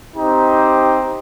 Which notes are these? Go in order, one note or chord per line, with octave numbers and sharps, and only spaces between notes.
C4 D#4 G4